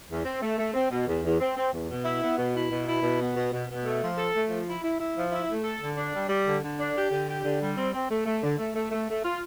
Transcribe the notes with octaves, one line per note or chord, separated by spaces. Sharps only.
E2
C4
A3
A3
C4
B2
E2
E2
C4
C4
E2
B2
E4
B3
B2
E4
B2
E4
B2
B3
B2
B2
B2
A3
F3
A4
A3
F3
E4
E4
E4
F3
E4
A3
A4
D3
D4
G3
G3
D3
D3
D4
G4
D3
G4
D3
G3
C4
C4
A3
A3
D3
A3
A3
A3
A3
F4